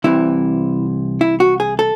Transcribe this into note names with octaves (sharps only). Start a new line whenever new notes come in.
C2 C3 E3 E4
E4
F#4
G#4
A4